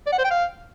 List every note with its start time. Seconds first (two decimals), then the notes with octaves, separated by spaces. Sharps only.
0.06 D5
0.12 F#5
0.18 C5
0.24 G5
0.31 F5